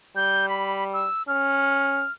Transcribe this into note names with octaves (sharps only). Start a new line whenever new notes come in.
G3 G6
B5
E6
C#4 F6